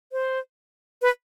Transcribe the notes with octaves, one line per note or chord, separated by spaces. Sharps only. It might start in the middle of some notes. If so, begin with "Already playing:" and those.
C5
B4